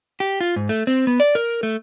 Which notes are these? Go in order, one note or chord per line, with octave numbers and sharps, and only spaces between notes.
G4
F4
G#2
A3
C4
B3
D5
A#4
A3